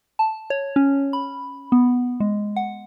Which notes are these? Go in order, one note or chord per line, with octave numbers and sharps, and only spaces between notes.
A5
C#5
C#4
B5
B3
G#3
F#5